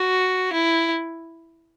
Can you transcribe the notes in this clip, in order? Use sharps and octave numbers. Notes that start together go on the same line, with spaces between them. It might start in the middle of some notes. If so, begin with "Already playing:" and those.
Already playing: F#4
E4